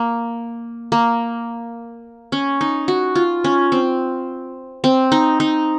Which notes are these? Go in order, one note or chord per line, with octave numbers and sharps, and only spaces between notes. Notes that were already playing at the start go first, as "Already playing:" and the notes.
Already playing: A#3
A#3
C#4
D#4
F#4
F4
C#4
C4
C4
D#4
D#4